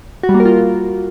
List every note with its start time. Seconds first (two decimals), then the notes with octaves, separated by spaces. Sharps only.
0.23 F#4
0.29 G3
0.34 A#3
0.40 A#4
0.45 F4